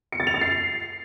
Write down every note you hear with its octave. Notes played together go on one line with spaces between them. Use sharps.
C#7
A6
F7
A6
C7